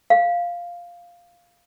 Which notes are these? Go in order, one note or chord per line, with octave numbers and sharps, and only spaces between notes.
F5